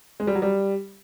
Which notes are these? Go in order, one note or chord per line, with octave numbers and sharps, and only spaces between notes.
G#3
G3
F#3
G3